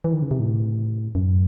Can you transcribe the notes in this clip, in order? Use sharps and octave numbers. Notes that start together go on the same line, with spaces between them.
E3
D#3
C#3
C3
A2
F#2